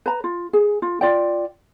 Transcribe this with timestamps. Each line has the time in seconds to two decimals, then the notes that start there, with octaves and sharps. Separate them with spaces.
0.06 B4 A#5
0.24 F4
0.53 G#4
0.82 F4
1.01 F4 D5 G5